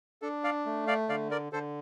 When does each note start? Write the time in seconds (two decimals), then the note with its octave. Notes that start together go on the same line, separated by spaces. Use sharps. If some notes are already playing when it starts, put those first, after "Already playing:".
0.22 D4 A4
0.44 D5 F5
0.66 A3
0.87 D5 F5
1.09 D3 D5 F5
1.31 A#4 D5
1.53 D3 A4 C5